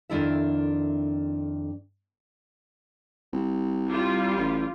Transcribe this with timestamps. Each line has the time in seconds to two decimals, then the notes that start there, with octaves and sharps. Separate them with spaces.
0.09 F2 D#3 D4 E4 A4 E5
3.33 C2
3.89 G3 F4
4.37 A1